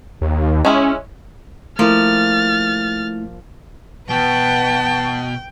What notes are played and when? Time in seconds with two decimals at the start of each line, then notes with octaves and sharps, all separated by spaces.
0.21 D#2
0.65 G#3 C#4 E4
1.79 F3 A3 A#3 E4 F6 A6
4.10 B2 B4 F#5 G5 A5